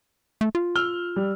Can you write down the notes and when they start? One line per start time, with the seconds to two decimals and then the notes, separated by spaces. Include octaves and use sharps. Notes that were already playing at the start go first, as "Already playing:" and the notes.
0.41 A3
0.55 F4
0.76 E6 F6 G7
1.16 G3